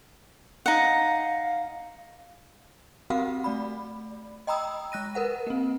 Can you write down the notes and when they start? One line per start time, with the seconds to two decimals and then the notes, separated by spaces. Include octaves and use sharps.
0.66 D#4 F5 F#5
3.10 C4 F#4 G4 A#4 F5 F#5
3.44 A3 D5 B5
4.47 D#5 G5 A#5 B5 D#6 E6
4.92 G#3 F#6 A#6 D#7
5.15 A#4 B4 F#5
5.47 A#3 C4